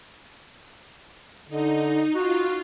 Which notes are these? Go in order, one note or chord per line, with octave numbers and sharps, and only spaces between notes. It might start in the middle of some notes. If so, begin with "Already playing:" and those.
D3 D#4
F4 F#4